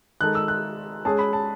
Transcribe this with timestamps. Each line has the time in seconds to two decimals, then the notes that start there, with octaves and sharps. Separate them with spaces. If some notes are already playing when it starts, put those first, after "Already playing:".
0.21 D#3 G#3 D#4 A4 F#6
0.35 E6
0.48 F#6
1.05 G#3 C#4 G#4 A5
1.19 B5
1.33 A5